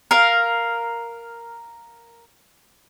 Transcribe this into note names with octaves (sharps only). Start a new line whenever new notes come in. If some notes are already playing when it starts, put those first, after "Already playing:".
A#4 F5